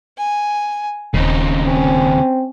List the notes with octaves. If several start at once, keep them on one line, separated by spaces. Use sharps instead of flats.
G#5
D#1 D#2 C#3 C4 D#4
C4 C#4